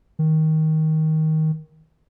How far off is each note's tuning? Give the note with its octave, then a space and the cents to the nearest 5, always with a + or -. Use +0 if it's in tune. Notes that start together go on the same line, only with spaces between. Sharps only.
D#3 +15